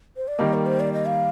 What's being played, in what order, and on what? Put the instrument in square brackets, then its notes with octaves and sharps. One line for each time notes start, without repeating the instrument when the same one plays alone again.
[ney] C5
D5
[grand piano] D#3 G3 A#3 [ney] D#5
[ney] A#4
C5
D5
D#5
F5